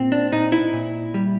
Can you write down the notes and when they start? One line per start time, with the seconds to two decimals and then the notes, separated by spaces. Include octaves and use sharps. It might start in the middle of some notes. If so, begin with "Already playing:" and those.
Already playing: A#2 C4
0.12 D4
0.32 A#2 D#4
0.52 E4
0.73 A#2
1.14 G3